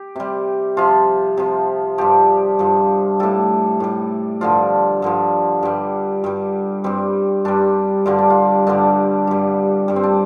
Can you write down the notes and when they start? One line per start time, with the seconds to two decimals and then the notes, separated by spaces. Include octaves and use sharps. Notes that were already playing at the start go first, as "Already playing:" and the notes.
Already playing: G4
0.16 C3 G3
0.77 C3 F3 F4
1.37 C3 F3
1.98 G2 F3 G4
2.59 G2 F3
3.20 A2 G3 A4
3.80 A2 G3
4.41 G2 D3 F3 F4
5.02 G2 D3 F3
5.63 G2 G3
6.24 G2 G3
6.84 G2 G3 C4
7.45 G2 G3 D4
8.06 G2 D3 G3 F4
8.18 D4
8.30 F4
8.67 G2 D3 G3 D4
9.27 G2 G3
9.88 G2 G3
9.96 C4
10.03 D4